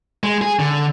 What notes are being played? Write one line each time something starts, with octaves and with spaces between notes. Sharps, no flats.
G#3
G#4
D3